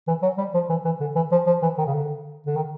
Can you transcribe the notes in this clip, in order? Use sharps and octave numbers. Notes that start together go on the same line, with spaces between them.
E3
F#3
G3
F3
E3
E3
D3
E3
F3
F3
E3
D#3
C#3
D3
D3
D#3